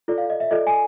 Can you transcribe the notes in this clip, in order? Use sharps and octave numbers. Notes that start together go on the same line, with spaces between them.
F4 A4 D5
F5
D#5
E5
F4 A4 D5 D#5
G#5